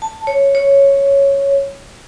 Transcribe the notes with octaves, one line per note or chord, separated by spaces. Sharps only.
A5
C#5
C#5